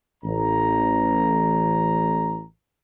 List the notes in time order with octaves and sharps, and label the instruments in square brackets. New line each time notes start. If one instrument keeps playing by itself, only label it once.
[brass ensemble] A1 A#5